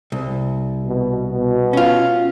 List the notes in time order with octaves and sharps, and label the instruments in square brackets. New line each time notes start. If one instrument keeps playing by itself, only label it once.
[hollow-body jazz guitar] C2
[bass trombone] B2
B2
[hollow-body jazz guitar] C#4 F4